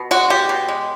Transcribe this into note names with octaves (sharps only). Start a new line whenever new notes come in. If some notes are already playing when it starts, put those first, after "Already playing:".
Already playing: B2
G#3 F#4
B2 G4
B2
G#3